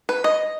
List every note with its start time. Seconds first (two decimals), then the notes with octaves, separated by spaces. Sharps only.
0.09 B4
0.24 D#5